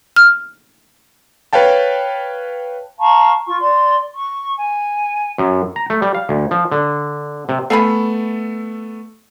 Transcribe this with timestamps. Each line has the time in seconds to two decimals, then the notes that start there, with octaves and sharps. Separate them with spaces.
0.16 F6
1.53 B4 C#5 F5 G5 A5
2.99 F5 A5 A#5 C#6
3.47 F4 C#6
3.60 D5 C6
4.14 C#6
4.58 G#5
5.38 F#2
5.76 A#5
5.90 A3
6.02 G3
6.15 F5
6.29 D2
6.51 F3
6.72 D3
7.49 C3
7.70 A3 B3 A4 F5 G#5 B5